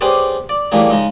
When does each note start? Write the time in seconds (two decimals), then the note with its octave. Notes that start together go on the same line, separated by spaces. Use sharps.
0.01 C#4 G4 G#4 B4 C5 D5
0.49 D5
0.72 A2 E3 G3 A3 A#3 G#4
0.91 C#3 G#3 D#4